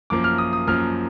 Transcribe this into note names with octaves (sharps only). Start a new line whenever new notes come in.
F#2 F3 A#3 D6
F6
D#6
D#6
F#2 F3 A#3 F6